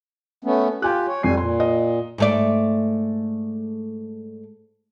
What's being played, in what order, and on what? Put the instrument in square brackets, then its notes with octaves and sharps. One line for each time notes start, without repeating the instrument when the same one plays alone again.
[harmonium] A3 B3 C#4
[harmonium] F4 G4 [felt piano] G5 G#5 F#6
[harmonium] C#5
[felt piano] F2 C4 C7 [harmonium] G3 G#5
[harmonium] A#2 [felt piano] C6
[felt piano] D#5
[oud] G#2 A3 D5